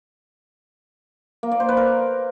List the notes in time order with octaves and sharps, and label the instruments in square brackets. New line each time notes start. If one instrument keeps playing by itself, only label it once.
[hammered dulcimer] A#3
D5
C5
B4
A#4